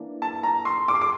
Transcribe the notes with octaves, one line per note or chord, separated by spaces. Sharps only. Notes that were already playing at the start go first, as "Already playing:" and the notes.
Already playing: E3 A#3 D4
A5
A#5
C6
D6
C6
D6